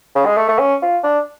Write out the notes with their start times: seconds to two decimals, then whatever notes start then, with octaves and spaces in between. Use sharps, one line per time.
0.15 C#3
0.26 G#3
0.37 A3
0.49 A3
0.59 C#4
0.82 F4
1.04 D4